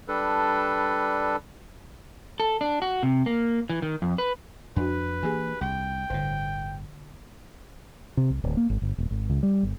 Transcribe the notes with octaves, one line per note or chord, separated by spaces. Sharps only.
G3 D4 A4 B4
A4
D4
F#4
C3
A#3
E3
D#3
F2
B4
F2 D4 F#4 B4
E3 A#3 G4 G#4 G#5
C2 G5
G1 A2 D3
C3
C2
D1
A#3
G#1
G1
D#1
G#1
C#2
G3
G1